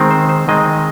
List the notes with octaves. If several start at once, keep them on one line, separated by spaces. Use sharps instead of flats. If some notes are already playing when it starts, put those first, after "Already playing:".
Already playing: D#3 G#3 C4
C5
C5
D#3 G#3 C4 D#5